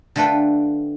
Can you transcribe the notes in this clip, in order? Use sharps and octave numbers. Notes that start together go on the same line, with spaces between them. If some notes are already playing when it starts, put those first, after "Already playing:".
D3 A3 F4 A4 B4 G5